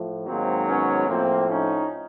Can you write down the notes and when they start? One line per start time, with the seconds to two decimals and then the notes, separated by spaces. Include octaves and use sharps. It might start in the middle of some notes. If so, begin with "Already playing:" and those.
Already playing: A2 F3
0.26 G#2 D#3 F#3 A#3 C4
0.67 B3 C#4
1.08 A2 F3 A#3 C4
1.50 C#4 D#4